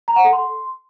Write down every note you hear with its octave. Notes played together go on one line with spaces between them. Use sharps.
A#5
F#5
A4
C6